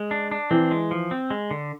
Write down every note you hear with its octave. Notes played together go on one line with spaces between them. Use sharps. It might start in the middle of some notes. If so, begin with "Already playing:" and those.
Already playing: G#3
D4
D4
E3 C4
G#3
F3
C4
G#3
D3